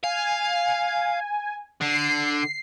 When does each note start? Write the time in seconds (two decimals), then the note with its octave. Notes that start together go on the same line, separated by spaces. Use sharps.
0.04 F5 G#5
1.81 D3 C7